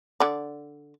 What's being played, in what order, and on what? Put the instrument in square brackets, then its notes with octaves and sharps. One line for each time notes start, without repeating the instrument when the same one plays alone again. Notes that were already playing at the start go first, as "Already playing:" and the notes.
[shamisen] D3 D5